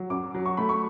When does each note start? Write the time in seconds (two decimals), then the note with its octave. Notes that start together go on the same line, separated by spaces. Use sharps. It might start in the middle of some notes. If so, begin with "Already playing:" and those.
Already playing: F#3
0.10 F#2 D6
0.35 F#3
0.46 C#6
0.57 A3 B5
0.69 C#6